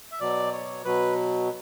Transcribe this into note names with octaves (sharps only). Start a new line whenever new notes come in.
E5
B2 F#3 D5
C#5
B2 F#3 B4